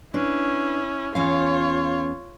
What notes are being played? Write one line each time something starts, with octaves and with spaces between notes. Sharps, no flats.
C#4 D4 E4 B4
E2 C#4 F4 C#5 F5